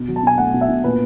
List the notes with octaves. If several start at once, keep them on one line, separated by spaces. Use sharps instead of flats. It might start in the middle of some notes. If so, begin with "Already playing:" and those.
Already playing: B2
F#3
A5
B2 G#5
A3 F#5
B2
E5
B2
A#2 B4